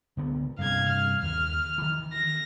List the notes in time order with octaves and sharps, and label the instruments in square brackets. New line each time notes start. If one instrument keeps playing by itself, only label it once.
[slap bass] C#2 D3 B3
[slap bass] G2 C3 E3 [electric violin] F5 G#6
[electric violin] F6
[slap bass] D#2 [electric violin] F6
[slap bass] D#3 E3
[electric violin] A#6